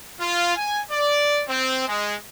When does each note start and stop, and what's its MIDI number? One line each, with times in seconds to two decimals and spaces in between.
0.21 0.54 65
0.56 0.80 80
0.91 1.43 74
1.48 1.86 60
1.88 2.15 56